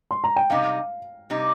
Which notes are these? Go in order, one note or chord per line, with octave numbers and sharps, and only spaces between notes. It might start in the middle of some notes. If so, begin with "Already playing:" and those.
C6
A#5
G5
C3 G3 D#4 F5
C3 G3 D#4